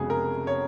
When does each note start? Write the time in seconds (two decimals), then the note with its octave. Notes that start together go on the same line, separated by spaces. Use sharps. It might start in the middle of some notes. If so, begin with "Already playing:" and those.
Already playing: F1 F2 C#3 G#3 B3 F#4 G#4
0.10 A#4
0.47 C#5